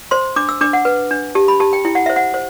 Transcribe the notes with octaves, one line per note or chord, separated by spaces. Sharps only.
C5 C6
D4 D6
E6
D4 D6
F#5
B4
D4
G4 A5
B5
G4 A5
G5
E4 G5
F#5
C5 E5
F#5
C5